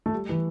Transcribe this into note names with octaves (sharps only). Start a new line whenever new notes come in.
A3
G3
E3